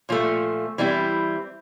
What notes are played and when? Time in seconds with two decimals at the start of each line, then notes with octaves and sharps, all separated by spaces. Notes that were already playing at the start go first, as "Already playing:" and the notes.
0.09 A#2 F3 A3
0.78 E3 G3 C4 E4